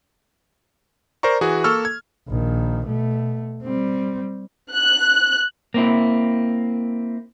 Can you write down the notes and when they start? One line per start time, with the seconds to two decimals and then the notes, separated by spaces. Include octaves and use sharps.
1.23 A#4 C5 D5 A#5 C#6
1.41 E3 F#4 G#4
1.64 A#3 A4 C#6 E6 F6
1.85 G#6
2.28 A#1 D#3
2.87 B2 A3
3.63 G3 C4
4.72 F#6
5.74 A#3 C4 E4